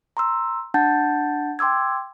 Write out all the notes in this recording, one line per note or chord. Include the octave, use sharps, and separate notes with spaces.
A#5 C6 E6
D4 F#5 A5 G6 A6
G5 C6 D6 E6 G#6